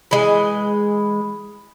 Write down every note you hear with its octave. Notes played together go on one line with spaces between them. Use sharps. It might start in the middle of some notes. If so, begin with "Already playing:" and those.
E3 G#3